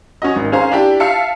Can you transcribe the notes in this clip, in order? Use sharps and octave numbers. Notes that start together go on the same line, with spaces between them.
C#4 F#4 D#5
G#1
C#4 G#4 C5 F5 A#5
D4 E4 G4
E5 F5 A5 C#7